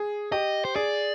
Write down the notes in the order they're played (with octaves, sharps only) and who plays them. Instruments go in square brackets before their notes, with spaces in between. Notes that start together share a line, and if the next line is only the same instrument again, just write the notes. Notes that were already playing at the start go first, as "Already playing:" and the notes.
Already playing: [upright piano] G#4
[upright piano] G4 [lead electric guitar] D#5
[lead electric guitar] C5
[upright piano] G#4 [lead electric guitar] D5